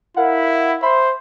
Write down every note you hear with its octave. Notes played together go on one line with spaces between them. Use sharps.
E4 A#4 F5 F#5
C5 E5 B5 C6